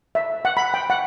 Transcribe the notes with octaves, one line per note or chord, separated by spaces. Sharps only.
E5
F#5
B5
G5
F#5